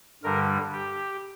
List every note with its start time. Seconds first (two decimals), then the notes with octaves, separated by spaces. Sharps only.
0.23 G2 D3 G3 A#4
0.73 G4